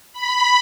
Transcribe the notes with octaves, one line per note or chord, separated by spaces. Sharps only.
B5